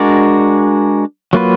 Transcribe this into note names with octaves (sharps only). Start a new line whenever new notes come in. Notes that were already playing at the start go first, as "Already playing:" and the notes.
Already playing: G#3 D4 F#4 A#4 D5
F#3 A#3 F4 B4